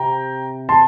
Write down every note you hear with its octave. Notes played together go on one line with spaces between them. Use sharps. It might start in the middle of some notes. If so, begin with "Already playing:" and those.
Already playing: C3 G5 A#5
A5 C6